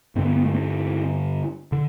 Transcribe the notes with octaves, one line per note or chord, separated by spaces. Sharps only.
G2 D3 C4
B3
B3
A3
C4
D3